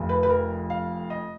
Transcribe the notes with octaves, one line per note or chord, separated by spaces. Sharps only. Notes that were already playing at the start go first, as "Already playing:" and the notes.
Already playing: F1 F2 F3
B4
B4
A#4
F5
D#5